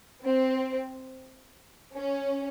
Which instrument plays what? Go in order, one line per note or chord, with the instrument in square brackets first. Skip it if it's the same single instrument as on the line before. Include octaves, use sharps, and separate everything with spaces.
[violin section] C4
C#4